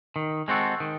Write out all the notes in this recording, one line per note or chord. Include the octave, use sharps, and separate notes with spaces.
D#3
G#3 C4 F#4 A4
D#3